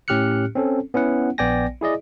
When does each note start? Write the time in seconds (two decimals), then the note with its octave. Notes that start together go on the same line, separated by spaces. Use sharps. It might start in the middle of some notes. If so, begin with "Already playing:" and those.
0.08 A2 C#4 G4 F6 F#6 C#7
0.55 C4 C#4 A4
0.94 B3 C#4 E4 F#5
1.38 A#1 B3 D5 G5 G#5 A#6
1.81 E4 G#4 D5 D#5